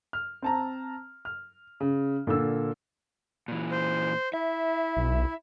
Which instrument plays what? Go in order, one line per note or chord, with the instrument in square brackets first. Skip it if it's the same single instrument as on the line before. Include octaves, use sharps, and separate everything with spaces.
[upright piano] F6
C4 A5 A#5
F6
C#3
A#2 D3 E6
[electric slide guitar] A#2 E3
[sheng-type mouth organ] C5
[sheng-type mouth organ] E4 [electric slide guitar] E5
[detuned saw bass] B1